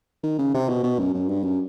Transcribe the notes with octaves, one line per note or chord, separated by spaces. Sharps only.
D#3
C#3
C3
B2
B2
F#2
F#2
G2
F#2